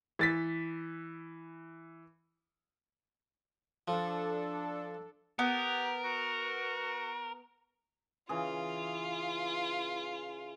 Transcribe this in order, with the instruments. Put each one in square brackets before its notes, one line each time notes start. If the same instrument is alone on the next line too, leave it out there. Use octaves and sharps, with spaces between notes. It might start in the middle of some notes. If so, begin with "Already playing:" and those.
[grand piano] E3 A6 B6
[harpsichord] F3 [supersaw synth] D4 A4
[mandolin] B3 [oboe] G4 [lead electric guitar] A#4
[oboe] F#4
[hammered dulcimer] C#3 E3 G#4 [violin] F4